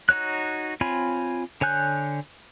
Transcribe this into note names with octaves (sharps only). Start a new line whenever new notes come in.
D#4 F#4 C#5 F#6
C4 F4 C#5 G#5 B5
D3 C#5 G#5 F#6 G6